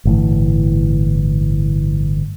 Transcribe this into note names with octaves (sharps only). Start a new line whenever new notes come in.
G1 A2 E3